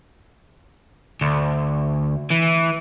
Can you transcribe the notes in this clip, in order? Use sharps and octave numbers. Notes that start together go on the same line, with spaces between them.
D2
E3